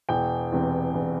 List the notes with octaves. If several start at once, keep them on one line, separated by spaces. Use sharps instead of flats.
E1 G5
E2 C3 E3
E1